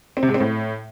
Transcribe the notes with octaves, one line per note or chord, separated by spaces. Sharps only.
C4
C3
G#2
C4
A2